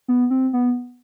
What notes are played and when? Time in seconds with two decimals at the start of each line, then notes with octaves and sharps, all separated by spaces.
0.08 B3
0.30 C4
0.53 B3